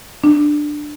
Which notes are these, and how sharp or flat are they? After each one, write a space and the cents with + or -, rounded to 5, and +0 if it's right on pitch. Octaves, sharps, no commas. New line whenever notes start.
D4 +15